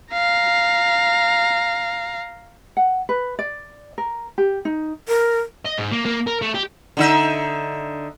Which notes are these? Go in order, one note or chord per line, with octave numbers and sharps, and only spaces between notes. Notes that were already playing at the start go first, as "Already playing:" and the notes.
F5 A#5
F#5
B4
D5
A#4
G4
D#4
A#4
D#5
G#2
A#3
A#3
A#4
A3
G4
D3 D#4 E5